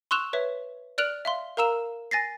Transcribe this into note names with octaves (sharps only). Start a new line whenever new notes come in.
C6 C#6 E6 F#6 E7 F7
B4 C#5 E5
D5 F6 F#6 D7 F7 F#7
E5 F5 C6
A#4 F5 A#5 E6 E7
G#5 A6 A#6 C7